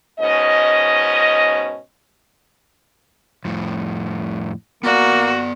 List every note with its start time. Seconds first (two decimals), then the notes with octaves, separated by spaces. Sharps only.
0.20 G#2 B2 C#4 D#5
3.45 F2 A2
4.83 A#3 B3 F#4 D5